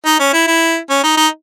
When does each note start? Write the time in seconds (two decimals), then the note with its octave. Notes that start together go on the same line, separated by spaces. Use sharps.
0.06 D#4
0.20 C#4
0.33 E4
0.47 E4
0.90 C#4
1.04 D#4
1.17 D#4